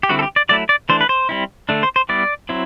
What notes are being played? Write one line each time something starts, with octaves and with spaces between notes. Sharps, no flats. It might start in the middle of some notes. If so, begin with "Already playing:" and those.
G4
D3 G3 C4 E4 F#4
A4
G4
D5
F#3 A3 E4 D5
D5
E3 A3 D4 C5
B4
C5
G3 C4 E4
D3 A3 D4
C5
C5
G3 B3 E4 D5
F#3 C4 E4